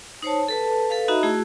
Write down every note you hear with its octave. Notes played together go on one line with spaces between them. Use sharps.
D#4 C5 C#5 A5
A4 B4 A5
A4 B4 F5
D#4 F#4 D#5 E5 A#5 B5
A3 E4 F#4 G#4